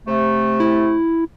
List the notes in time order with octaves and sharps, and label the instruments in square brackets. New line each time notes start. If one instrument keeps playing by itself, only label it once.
[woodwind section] C3 A3
[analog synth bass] E4